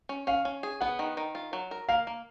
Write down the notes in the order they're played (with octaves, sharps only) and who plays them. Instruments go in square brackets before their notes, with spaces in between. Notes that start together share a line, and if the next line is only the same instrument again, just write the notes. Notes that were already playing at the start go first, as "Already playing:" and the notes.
[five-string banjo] C#4
[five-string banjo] C#4 [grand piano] F5
[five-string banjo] C#4
G#4
[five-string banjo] B3 [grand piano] F#5
[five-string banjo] D#3
D#3
F4
F#3
A#4
[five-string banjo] A#3 [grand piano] F5
[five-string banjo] A#3